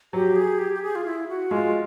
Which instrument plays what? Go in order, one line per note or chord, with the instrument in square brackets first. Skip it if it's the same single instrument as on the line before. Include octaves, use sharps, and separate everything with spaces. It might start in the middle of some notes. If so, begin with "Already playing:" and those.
[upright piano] F#3 [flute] G4
[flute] G#4
G4
G4
G#4
F4
E4
F#4
[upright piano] G#3 [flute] F4